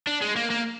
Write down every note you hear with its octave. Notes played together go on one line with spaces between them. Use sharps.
D4
G#3
A#3
A#3